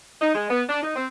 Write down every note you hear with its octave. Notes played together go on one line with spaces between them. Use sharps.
D#4
G#3
B3
D4
D#4
C4